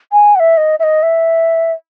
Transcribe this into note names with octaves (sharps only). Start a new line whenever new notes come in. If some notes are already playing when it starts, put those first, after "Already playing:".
G#5
F#5
E5
D#5
E5
D#5
E5